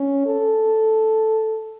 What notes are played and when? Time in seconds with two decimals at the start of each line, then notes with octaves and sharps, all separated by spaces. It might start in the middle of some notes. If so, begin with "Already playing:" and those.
Already playing: C#4
0.26 A4